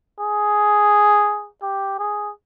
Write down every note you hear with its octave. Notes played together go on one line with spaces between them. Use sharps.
G#4
G4
G#4